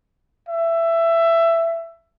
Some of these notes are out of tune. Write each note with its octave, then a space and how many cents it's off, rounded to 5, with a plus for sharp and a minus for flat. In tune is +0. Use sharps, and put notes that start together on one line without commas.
E5 +15